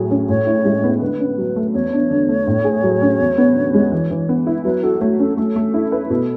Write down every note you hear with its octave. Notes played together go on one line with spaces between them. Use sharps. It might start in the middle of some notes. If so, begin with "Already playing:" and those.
Already playing: A2 F#3 G#4
C#4
A2 C#5
E4
G#3
B3
D3 B4
C#4
F#3
A3
E2 C#5
D4
D3
A3
A2
G#4
F#3
C#4
E2
B3
D3
G#3
E3
E3
B3
E4
F#3 B4
F#4 A4
A3 C#5
C#4 A4
A3 A4
A3
E4
B4
B2 A4